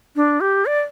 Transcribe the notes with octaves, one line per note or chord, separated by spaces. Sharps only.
D4
G4
D5